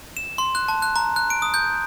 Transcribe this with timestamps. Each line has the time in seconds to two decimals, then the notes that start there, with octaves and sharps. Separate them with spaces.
0.17 E7
0.38 C6
0.55 F#6
0.68 A5
0.82 F#6
0.96 A#5
1.16 F#6
1.30 D7
1.42 D#6
1.54 G6